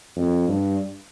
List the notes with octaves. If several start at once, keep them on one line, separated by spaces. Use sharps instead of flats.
F2
G2